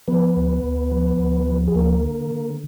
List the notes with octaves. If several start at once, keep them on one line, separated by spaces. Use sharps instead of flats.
F3 B3 B4
D2
D2
F3
D2
F3
G#4
D2 A#3 A#4
D3
D3